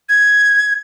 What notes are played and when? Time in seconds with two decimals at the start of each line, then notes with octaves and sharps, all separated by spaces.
0.09 G#6